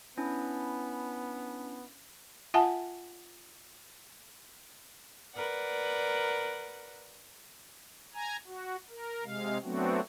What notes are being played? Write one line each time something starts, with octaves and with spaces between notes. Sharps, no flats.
B3 C#4 D4 E4
F4 E5 F#5 G#5 A5
A#4 B4 D5 F#5
G#5 A#5
F#4
A#4
C3 G#3 F5
F#3 A3 B3 C4 D4 F#4